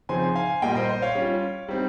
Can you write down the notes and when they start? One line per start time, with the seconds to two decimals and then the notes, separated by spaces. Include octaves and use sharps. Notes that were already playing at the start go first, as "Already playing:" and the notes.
0.09 C#3 F3 C4 D#4 G#5 C6
0.36 F5 G#5
0.62 A#2 G3 A#3 D#5 G5
0.75 C5 D#5
0.89 C5 D#5
1.02 C#5 F5
1.15 G3 C#4 F4
1.68 G3 C4 D#4